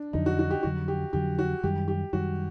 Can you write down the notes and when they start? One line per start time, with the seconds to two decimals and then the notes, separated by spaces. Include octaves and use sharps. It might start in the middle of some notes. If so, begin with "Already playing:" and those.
Already playing: D4
0.13 F2 D3 F#3 D#4
0.26 F#4
0.39 F#4
0.50 G4
0.63 F2 D3 F#3 F#4
0.88 G4
1.13 F2 D3 F#3 G4
1.39 F#4
1.63 F#2 D#3 G3 G4
1.88 G4
2.13 F#2 D#3 G3 F#4